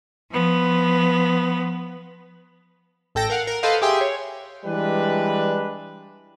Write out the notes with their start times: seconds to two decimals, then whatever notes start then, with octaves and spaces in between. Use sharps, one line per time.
0.30 F3 B3
3.15 A1 A4 G5 A#6
3.30 A#4 F5 F#5
3.47 A#4
3.63 A4 B4 C5 D#5 F5
3.82 G4 G#4 E5 G5 C6
4.01 C#5
4.65 E3 G3 G#3 D4 B4